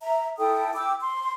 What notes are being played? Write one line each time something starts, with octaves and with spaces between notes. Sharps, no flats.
E5 A#5
E4 A4 G5 D#6
G5 D6 E6
C6